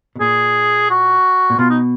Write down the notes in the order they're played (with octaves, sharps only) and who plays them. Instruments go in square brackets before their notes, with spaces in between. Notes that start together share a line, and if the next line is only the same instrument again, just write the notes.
[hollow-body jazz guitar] B2
[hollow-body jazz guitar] A#2 [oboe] G#4
[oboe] F#4
[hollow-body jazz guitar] A#2
[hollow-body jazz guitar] B2 [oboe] F4
[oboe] D#4